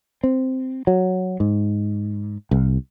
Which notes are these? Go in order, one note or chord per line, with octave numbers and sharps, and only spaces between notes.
C4
F#3
G#2
C2